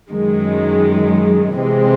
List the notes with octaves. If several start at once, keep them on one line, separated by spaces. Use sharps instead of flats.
F#2 D#3 G#3
C3 E3 G#3 C4